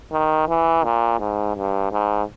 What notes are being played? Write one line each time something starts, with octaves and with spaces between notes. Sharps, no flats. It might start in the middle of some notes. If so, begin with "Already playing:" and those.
D#3
E3
A#2
G#2
G2
G#2